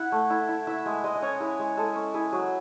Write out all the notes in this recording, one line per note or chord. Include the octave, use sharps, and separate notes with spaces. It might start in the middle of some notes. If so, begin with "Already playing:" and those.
Already playing: E4 F#5
A3
E4
E4
E4 E5
G#3 E5
G#3 D#5
D#5
C#4 C#5
E4 G#4
G#3
G#3 A4
C#4
E4 G#4
F#3 G#4